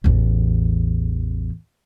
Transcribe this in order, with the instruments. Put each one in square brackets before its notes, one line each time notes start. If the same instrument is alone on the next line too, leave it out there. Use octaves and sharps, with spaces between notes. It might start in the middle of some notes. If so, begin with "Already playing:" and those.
[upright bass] A1 E2